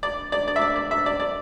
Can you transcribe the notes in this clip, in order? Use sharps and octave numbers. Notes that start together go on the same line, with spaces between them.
D5
D5
D5
E5
D5
D5
E5
D5
D5